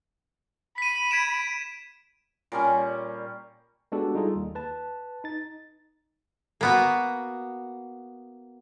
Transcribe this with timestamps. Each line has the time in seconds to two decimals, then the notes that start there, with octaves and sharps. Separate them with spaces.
0.78 B5 B6 D#7
1.11 G#6 D7 E7
2.52 A#2 G3 C#4
3.92 G#3 B3 D4 F#4 G4 A4
4.15 G3 D#4 F4 G#4 A4
4.35 D#2
4.55 B4 A5
5.24 D#4 A6
6.61 A#3 B3 F#4